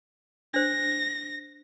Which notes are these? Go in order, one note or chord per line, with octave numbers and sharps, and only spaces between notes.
D4 C5 A#6